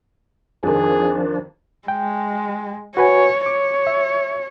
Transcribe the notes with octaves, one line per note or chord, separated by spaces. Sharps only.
F2 D#3 F3 D4 G#4
G#3 G5
F#4 B4 C#5 G#5
C#5 D6
E5